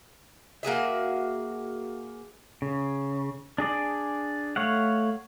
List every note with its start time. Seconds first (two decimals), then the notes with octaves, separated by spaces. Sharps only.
0.63 A#3 F#4 G#4 E5
2.62 C#3
3.58 D4 G#4 D5
4.56 A3 C#5 F5 F#5